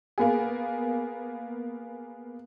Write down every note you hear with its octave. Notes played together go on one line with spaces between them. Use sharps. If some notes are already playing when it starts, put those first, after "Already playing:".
A#3 B3 G#4